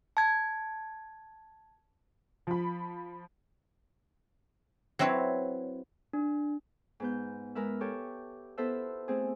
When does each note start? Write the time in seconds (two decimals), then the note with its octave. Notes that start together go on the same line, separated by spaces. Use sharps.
0.17 A5 G#6
2.47 F3 B5
4.99 F#3 C4 E4 B4 C#5
6.13 D4
7.00 G#2 B3 G6
7.55 G#3 A#4 B4 E5
7.81 G4 A4 C#5
8.58 B3 E4 F4 A4 C5 E5
9.08 A3 C4 G#4